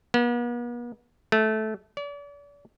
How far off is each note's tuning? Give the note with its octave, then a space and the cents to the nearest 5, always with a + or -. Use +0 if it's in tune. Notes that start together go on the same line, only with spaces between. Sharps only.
B3 -45
A3 -15
D5 -40